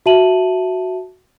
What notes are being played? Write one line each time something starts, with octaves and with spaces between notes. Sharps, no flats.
F#4 E5 A5 D#7 F#7